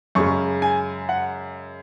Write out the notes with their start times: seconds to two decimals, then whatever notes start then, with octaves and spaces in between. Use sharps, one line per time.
0.15 F#2 C#3 G#3 C#6
0.62 G#5
1.09 F#5